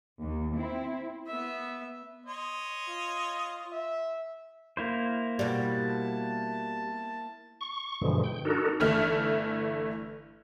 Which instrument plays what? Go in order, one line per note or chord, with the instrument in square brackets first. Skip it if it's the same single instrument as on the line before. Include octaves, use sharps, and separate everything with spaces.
[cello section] D#2
C4 E4
[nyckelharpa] B3 E5
[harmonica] C#5 D#5 C6
[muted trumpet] F4
E5
[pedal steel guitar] A#3 E4 C5
[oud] B2 G3 [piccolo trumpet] A5
[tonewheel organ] C#6
G2 B2 D3 E3 F3 G#3
G5
D4 D#4 F#4 A4 A#4
[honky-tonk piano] G1 E3 A3 E4 F6